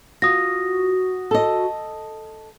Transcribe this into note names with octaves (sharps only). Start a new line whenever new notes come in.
F4 F#4 D#6 A#6
A4 D#5